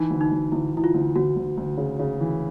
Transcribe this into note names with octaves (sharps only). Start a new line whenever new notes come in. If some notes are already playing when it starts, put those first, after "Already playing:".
Already playing: E3 D#4
D2
D#4
D2
D2 E4
E3 E4
F4
D2
D2 F#4
D2
D2
C#3
C#3
E3